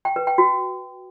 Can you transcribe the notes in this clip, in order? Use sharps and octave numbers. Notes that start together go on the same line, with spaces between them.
G5
B4
G5
F#4